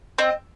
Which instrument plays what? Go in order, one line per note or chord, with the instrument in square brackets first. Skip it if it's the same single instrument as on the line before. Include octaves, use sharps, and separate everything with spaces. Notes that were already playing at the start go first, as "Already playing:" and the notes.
[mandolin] C4 [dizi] D#5